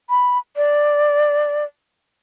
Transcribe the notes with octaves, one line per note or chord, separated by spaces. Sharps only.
B5
D5